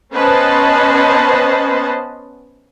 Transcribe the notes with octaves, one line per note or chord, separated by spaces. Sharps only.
B3 C#4 B4 C5 D#5 A5